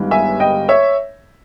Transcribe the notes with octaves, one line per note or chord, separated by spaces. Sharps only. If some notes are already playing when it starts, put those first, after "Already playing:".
Already playing: G1 G2 D#3 G#3
E5 G#5
D#5 G5
C#5 E5